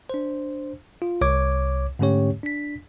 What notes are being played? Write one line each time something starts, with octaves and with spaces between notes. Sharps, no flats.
D4 C5
F4
C2 C#5 D6 G#6
G#2 D3 A3 C#4 G4 C#5
D4 B6